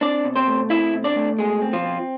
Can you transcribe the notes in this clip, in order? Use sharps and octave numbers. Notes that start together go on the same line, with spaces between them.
C4 D4 D5
B2
C4 C5
A3
C4 E4 E5
B2
D4 D5
A3
B2 G#3 G#4
C4
F3 F4
C4